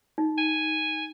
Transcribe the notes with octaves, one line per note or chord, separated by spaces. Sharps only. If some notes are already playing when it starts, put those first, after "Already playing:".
D#4
G#5